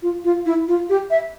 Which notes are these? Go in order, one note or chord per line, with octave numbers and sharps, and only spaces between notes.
F4
F4
E4
F4
G4
E5